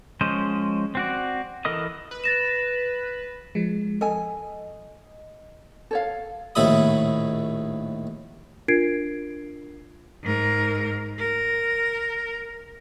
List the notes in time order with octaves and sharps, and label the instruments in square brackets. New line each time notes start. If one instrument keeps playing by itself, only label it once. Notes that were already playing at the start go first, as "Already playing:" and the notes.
[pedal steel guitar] F3 G#3 C#4 C5 D#5
C4 F#4 D5
E3 A4 A#4 D#5 D#6
[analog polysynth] B4
[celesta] A6 A#6 E7
[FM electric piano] F3 G#3
[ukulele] A4 G#5 [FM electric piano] D#5
[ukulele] A4 C#5 F5
[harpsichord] A#1 D#2 A2 E4 B5 D#6
[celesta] D4 F4 A#4 G#6 C7 D7
[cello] G#2 A#4
A#4